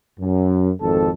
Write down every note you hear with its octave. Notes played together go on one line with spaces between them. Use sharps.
F#2
G#1 F2 A4